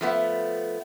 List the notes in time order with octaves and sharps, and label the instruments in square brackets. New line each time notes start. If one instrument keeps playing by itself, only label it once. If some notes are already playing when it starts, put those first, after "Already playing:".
[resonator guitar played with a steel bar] F3 A3 B3